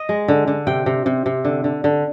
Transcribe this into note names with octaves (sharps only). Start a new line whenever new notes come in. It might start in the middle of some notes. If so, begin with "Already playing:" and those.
Already playing: D#5
G#3
D3
D3
C3 G5
C3
C3
C3
D3
D3
D3